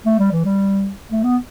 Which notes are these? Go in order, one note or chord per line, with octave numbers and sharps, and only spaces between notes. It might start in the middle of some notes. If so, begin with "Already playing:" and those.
A3
G3
E3
G3
A3
B3